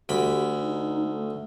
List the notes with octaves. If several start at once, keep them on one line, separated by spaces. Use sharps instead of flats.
D2 G4 B5
D#4
A3